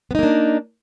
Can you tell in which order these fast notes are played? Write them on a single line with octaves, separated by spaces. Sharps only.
B3 D#4 A#3 D4